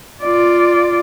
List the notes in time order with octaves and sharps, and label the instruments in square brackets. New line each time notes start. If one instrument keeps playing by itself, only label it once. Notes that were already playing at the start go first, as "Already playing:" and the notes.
[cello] F4 D5